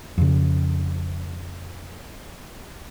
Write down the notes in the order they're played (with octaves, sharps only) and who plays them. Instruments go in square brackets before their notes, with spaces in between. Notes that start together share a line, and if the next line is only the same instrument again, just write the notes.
[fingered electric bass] F2 C#3